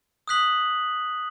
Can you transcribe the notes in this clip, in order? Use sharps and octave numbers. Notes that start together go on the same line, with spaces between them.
D#6 F#6 B6 F#7